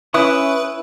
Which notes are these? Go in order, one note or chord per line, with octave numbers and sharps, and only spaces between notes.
C#4 E4 B4 C#6 D#6 F#6